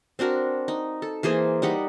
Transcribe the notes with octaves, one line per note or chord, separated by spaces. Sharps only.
C4 D4 F#4 A#4
D#4
A4
E3 A#3 G#4 C5
G3 D#4 F#5 B5